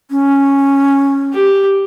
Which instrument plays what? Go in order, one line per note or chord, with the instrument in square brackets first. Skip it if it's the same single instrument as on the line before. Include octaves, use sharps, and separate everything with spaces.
[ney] C#4
[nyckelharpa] G4